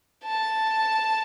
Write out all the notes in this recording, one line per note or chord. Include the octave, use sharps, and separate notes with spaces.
A5